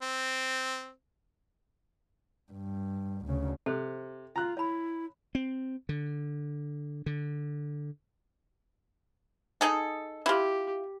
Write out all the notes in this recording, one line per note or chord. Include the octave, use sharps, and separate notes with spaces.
C4
G2
D2 C#3
C3 A4 C5
F4 A#5 F#6
E4 C#5 B5
C4
D3
D3
D#4 G#4 A4
E4 F4 G4